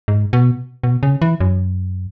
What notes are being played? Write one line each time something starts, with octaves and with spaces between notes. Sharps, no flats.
G#2
B2
B2
C#3
E3
F#2